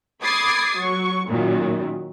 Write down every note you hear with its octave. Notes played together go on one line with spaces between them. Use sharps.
B5 D6 D#6 G#6 A6 C7
F#3 C#6
F#2 A#2 D#3 F#3